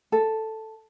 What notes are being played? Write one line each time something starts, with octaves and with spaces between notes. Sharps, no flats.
A4